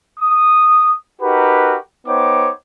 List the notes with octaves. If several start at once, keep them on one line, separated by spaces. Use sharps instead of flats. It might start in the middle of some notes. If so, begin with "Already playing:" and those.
D#6
D#4 F#4 G4 A#4 B4
B3 D#4 C5 C#5 G5 D6